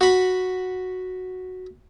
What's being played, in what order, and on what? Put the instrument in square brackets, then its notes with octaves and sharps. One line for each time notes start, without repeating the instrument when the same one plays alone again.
[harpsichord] F#4 B5